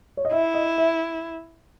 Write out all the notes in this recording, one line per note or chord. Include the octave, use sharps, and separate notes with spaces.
C#5
D#5
E4 E5
D#5
E5